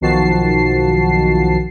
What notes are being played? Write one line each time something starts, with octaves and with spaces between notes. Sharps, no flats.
B1 D#3 F3 F#4 A5 C7